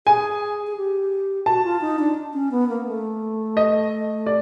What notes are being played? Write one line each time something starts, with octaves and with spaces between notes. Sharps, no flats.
G#4 G#5
G#4
G4
F#4 A5
F4
D#4
D4
C#4
B3
A#3
A3
D#5
D5